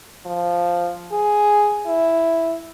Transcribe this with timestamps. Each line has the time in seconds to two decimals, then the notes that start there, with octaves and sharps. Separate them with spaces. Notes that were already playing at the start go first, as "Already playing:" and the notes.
0.26 F3
1.12 G#4
1.87 E4